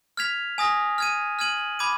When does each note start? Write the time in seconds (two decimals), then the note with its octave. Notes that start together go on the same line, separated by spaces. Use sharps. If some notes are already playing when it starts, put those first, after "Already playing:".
0.17 F6 G#6 B6 F7
0.58 G#5 D#6 A#6
0.98 F6 G#6 D#7
1.39 F6 G#6 D#7 F#7
1.79 B5 D6 G#6 D#7